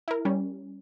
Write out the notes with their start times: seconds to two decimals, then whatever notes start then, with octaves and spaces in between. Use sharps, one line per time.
0.08 E4 A#4
0.25 G3 C#4